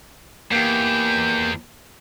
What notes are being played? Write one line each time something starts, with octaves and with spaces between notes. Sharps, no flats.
E2 A#3 G4 G6